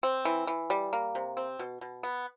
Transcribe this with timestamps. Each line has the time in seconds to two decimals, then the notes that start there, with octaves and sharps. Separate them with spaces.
0.03 C4
0.25 E3
0.47 E3
0.70 G3
0.93 A#3
1.15 C3
1.37 C4
1.59 B2
1.81 B2
2.03 B3